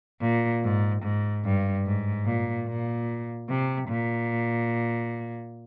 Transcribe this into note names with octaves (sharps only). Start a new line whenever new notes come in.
A#2
G#2
G#2
G2
G#2
A#2
A#2
C3
A#2